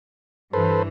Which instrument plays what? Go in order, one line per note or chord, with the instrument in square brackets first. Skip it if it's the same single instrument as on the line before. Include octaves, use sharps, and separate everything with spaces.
[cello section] G2 E3 [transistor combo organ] A4 B4 C5